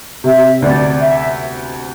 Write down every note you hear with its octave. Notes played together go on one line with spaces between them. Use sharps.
C3 E5
D2 D5
E5